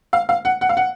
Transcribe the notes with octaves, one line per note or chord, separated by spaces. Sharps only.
F5
F5
F#5
F#5
F5
F#5